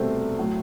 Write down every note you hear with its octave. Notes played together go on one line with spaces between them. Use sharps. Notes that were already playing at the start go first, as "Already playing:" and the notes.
Already playing: C2 B2 A3 C4 C5
A2 F#3